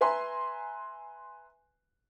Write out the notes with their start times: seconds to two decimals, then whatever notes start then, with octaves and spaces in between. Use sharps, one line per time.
0.01 B4 E5 G#5 A#5 C6